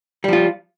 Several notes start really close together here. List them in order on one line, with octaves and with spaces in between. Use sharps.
G3 F3 F4